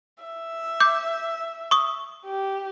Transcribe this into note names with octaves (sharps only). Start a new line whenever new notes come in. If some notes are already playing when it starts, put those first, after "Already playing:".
E5
D6 G6
C#6 D#6
G4